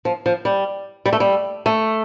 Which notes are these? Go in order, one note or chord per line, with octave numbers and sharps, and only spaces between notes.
F3
F3
G3
G3
A3
G3
A3